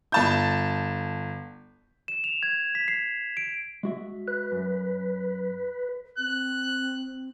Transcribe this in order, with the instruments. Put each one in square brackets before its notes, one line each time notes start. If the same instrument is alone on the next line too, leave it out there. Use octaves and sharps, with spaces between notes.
[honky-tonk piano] G1 A5 G6
[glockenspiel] E7
F7
G#6
B6
C7
D7
[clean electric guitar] G#3 F#4 E5
[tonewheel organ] B4
[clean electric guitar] F#2
[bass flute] C4 [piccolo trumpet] F#6